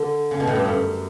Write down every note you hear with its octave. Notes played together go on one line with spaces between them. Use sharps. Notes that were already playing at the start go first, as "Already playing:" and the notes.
Already playing: D3
C#3
B2
A2
G2
F#2